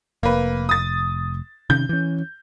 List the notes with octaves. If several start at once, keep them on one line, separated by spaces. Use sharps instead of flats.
F1 A#3 B4
D#6 A6
C3 D#3 C#4 G6
E3 C#4